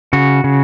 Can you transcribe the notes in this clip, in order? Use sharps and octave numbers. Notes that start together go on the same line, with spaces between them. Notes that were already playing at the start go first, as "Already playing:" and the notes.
C#3 F#4
C#3